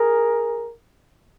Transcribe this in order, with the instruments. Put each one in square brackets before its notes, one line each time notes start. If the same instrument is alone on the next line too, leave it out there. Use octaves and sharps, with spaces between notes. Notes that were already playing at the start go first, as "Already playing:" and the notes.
Already playing: [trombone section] G#4 A#4